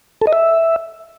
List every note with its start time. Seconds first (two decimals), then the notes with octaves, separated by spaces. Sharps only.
0.22 A4
0.27 D#5
0.33 E5